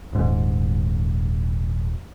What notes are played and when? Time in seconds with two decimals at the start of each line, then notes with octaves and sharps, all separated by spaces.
0.13 D#1 G#2